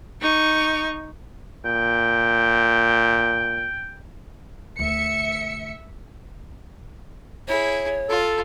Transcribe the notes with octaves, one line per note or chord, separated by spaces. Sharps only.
D#4 C#6
A#2 G5
D2 E5 C#7
E4 G#4 C#5
F4 A4